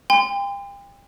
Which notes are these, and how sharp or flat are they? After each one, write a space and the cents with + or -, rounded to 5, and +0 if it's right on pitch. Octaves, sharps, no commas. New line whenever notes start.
G5 +35 C6 -35